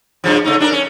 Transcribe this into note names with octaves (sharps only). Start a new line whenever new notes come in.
G2 C#3 F3
C#3 A3 D#4
D4 G#4 A#4
C#4